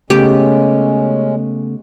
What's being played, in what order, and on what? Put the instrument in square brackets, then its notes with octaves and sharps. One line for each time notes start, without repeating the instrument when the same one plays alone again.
[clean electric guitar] C#3 A3 B3 [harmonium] G#3 C#4 [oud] G4